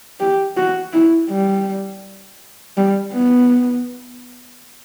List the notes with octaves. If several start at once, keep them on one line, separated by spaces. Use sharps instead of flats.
G4
F#4
E4
G3
G3
B3